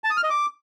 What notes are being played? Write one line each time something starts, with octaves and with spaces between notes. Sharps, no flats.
A5
D#6
F6
D#5
D6